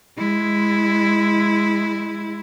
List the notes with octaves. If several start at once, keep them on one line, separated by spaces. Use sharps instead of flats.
G#3 E4